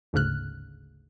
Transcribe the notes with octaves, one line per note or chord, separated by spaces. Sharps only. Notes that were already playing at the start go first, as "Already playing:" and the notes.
G1 D2 G#2 C#3 F6 F#6